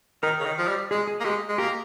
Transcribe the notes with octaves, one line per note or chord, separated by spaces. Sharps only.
D#3 A#4
C#3
D#3
F3
G3
G#3 G#4
G#4
A#3
G#3 G4
G#3
A#3 G4